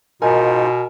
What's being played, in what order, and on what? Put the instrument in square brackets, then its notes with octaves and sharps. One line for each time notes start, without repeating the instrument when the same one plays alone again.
[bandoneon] G#2 D#4 F4 [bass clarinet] B2 [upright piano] A#4 G#5